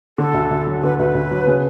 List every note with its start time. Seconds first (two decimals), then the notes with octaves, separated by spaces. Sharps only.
0.18 D3 A4
0.34 D2
0.51 D2
0.67 F#3
0.83 D3 B4
0.99 D2 B4
1.14 D2
1.31 F#3
1.47 C#3